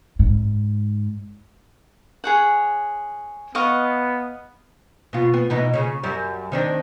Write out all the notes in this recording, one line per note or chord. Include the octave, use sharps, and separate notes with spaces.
G#2
G#4 C#5 F#5
B3 D#5 F5 C#6
B2 F4
B3
B2 E3 D#4
C#3 C#4
F#2 G3
D#3 C4 D4